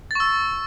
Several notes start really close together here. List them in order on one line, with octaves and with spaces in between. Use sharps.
A6 C#6 E6